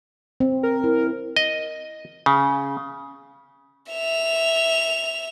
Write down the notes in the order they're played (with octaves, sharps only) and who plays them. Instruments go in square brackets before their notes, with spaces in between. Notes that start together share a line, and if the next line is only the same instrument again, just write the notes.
[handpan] C4
[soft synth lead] A#4
[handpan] E4
[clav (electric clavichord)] D#5
C#3
[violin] E5 F7